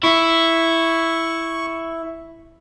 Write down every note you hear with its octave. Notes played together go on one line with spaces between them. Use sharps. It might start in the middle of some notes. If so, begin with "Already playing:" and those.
E4 C#6